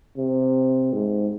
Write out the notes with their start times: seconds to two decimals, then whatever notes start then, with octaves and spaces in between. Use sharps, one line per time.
0.17 C3
0.93 G#2